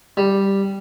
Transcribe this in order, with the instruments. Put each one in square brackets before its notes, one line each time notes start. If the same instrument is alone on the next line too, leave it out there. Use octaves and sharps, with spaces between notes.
[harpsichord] G3